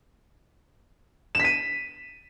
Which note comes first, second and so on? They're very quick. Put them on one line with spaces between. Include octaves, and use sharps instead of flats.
E7 B6 D#7